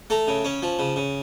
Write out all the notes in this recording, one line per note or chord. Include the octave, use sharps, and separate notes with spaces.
A3 A#5
C#3
C#4
F3
C#3
C#3